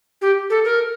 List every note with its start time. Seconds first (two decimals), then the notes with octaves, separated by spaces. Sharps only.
0.21 G4
0.50 A4
0.65 A#4